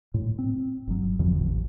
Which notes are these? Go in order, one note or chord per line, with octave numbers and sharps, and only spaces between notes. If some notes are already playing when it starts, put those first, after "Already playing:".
A2
C4
G1 F#3
F2 D3 F3
A1